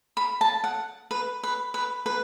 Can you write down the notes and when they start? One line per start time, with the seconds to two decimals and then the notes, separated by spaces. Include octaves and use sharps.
0.17 B5
0.41 A5
0.64 F#5
1.11 B4
1.43 B4
1.74 B4
2.06 B4